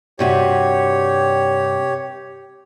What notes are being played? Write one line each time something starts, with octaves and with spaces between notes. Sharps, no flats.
G2 C3 F#4 G4 C#5